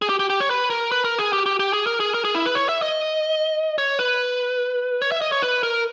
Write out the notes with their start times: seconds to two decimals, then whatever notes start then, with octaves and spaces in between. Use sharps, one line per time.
0.02 G#4
0.09 G4
0.20 G4
0.30 G4
0.40 C#5
0.50 B4
0.70 A#4
0.92 B4
1.05 A#4
1.19 G#4
1.33 G4
1.46 G4
1.60 G4
1.73 G#4
1.87 A#4
2.00 G#4
2.14 A#4
2.25 G#4
2.35 E4
2.46 B4
2.55 C#5
2.69 E5
2.82 D#5
3.78 C#5
3.99 B4
5.02 C#5
5.12 E5
5.22 D#5
5.32 C#5
5.42 B4
5.63 A#4